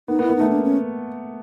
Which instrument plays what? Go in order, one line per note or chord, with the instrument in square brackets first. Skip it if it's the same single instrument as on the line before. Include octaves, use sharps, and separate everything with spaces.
[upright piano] B3 [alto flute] D#4
[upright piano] B3
[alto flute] E4
[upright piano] B3
[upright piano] A3 [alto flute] D#4
[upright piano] A#3 [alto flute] D4
[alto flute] C#4